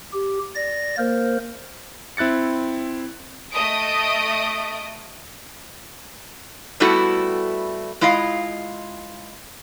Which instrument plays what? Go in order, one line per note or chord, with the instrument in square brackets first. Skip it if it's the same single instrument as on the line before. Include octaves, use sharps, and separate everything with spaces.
[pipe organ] G4
D5 A#6
A#3 A#4 C5
[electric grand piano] C4 E4 F#6 A6 C#7
[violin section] A3 D#5 D#6 D7
[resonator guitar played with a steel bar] G3 A3 B3 E4 F#4 A4
G#3 E4 F4 D#5 F5